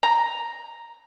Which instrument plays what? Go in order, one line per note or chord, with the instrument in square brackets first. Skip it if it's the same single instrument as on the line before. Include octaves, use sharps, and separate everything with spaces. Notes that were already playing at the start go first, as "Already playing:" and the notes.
[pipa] A#5